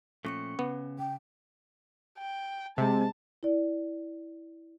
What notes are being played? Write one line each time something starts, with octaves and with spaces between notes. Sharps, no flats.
A#2 F3 A3 C#4 C#6 C#7
C#3 B3 C#4
G5
G5
C3 G#3 A5
E4 D5